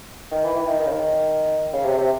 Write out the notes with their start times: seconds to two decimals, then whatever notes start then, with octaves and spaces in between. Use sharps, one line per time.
0.32 D#3
0.45 E3
0.56 E3
0.67 D#3
0.80 D#3
0.86 C#3
0.92 D#3
1.73 C#3
1.85 C3
1.98 C3